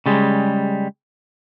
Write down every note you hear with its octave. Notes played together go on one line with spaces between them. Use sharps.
C#3 G3 G#3